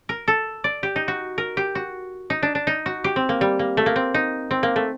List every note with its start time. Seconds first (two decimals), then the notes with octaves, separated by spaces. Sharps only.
0.09 A#4
0.28 A4
0.64 D5
0.83 G4
0.96 D#4
1.08 F#4
1.38 A#4
1.57 G4
1.75 F#4
2.30 D#4
2.43 D4
2.55 D4
2.67 D#4
2.86 F#4
3.04 G4
3.16 C4
3.29 A#3
3.41 G3
3.59 A#3
3.77 A3
3.86 A#3
3.96 C4
4.14 D#4
4.51 C4
4.63 A#3
4.76 A3